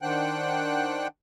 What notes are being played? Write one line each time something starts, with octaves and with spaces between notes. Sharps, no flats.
D#3 D4 C5 F#5 G5 F#6